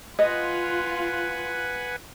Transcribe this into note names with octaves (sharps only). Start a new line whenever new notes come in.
F4 B4 D#5 F#5 G#5